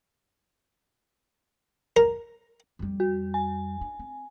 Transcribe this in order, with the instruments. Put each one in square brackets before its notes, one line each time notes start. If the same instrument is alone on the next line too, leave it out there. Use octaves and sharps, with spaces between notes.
[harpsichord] A#4
[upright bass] F2 G3
[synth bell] F#4
G#5
[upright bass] D4
C4